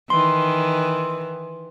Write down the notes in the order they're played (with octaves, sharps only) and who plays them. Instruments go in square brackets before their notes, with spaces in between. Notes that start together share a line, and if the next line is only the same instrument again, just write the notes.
[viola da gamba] D#3 E3 [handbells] C6